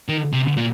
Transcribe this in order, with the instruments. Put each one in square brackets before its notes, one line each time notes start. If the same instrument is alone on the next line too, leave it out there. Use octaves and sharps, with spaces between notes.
[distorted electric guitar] D#3
C3
A#2